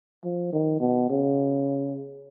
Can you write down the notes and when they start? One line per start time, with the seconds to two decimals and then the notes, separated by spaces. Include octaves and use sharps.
0.24 F3
0.52 D#3
0.80 B2
1.09 C#3